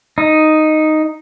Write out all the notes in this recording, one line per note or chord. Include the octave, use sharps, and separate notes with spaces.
D#4